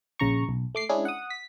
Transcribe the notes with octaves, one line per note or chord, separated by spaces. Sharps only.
A#1 C#3 A#5 C#6
B1
A3 D6 C7
G#3 C#4 D4 E4 G#4
F#5 D#6
B6